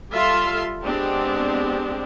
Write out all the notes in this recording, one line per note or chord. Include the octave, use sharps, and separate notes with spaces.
G3 F4 A4 E5 F5 C6
G#3 B3 C4 D4 G4